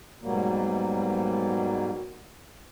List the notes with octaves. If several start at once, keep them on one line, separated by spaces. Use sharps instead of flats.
G#2 B2 F#3 G3 A#3